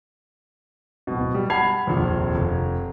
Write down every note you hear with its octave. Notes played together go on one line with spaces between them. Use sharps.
D1 B2
G3
F#5 A5 B5 G#6 C7 F7
F1 A#1 D#2
F1